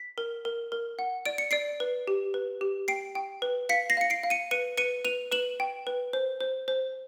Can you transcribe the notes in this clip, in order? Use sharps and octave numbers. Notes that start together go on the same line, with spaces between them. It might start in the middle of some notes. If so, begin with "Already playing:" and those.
Already playing: B6
A#4
A#4
A#4
F#5
D5 D7
C#7
D5 C7 D7
B4
G4
B4
G4
G5 C7 D7
G5
B4
F5 B6 C#7
A#6 C7
F5 C#7
C7 D7
F5
C#7 D#7
B4 C#7 D#7
B4 C#7 D#7
B4 D#7 F7
B4 E7 F#7
G5
B4
C5
C5
C5